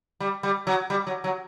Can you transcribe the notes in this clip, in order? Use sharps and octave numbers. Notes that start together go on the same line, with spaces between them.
G3
G3
F#3
G3
F#3
F#3